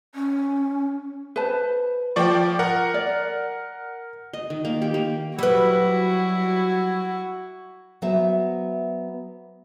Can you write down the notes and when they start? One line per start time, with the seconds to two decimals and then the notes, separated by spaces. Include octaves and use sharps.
0.15 C#4
1.36 B4 C5 A5
2.16 F3 F4 C5 D5 G5 C#6
2.59 A#4 F#5
2.94 D5
4.33 D#5
4.50 D#3
4.65 A#3
4.82 G4
4.94 A#3
5.39 F#3 G3 E4 F#4 B4
8.02 F#3 B3 C5 E5